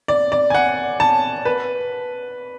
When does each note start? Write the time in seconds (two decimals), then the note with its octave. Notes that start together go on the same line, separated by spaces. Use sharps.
0.08 D5
0.32 D5
0.50 G#5
0.54 F#5
1.00 A5
1.45 B4